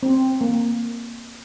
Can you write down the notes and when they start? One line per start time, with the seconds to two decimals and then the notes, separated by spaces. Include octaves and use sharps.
0.03 C4
0.41 A#3